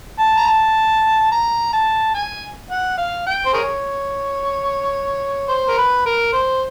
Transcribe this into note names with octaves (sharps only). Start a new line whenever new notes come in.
A5
A#5
A5
A#5
A5
G#5
F#5
F5
G5
C5
G#4 A#4 C#5
C5
A#4
B4
A#4
C5